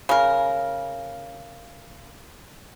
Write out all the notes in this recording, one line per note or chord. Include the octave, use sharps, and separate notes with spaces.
C#3 A#4